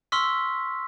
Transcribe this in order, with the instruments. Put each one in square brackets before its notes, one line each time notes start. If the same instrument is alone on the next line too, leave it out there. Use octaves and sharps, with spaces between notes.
[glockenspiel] C6 C#6 E6 F6 B6